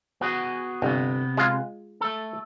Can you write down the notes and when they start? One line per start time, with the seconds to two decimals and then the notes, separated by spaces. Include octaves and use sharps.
0.21 B3 F#4 G#4
0.82 G1 C3 B3
1.37 G#3 F4
2.01 A3 A4